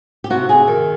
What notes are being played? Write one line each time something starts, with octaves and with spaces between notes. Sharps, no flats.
G4
C3 F#4
C3 G#4
D#3